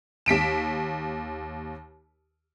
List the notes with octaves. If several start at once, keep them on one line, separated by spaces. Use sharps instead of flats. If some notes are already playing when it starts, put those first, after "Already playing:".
D#2 B6 D7 E7